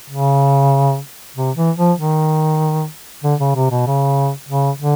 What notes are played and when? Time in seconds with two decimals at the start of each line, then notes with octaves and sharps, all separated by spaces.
0.10 C#3
1.37 C3
1.56 E3
1.78 F3
1.98 D#3
3.24 D3
3.40 C#3
3.55 C3
3.71 B2
3.87 C#3
4.49 C#3
4.80 D3